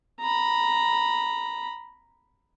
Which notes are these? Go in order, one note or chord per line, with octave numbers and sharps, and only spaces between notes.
A#5 B5